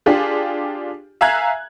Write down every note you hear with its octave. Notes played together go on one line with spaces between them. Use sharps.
D4 F4 G4 G#4
E5 F5 G#5 A#5 F#6 G#6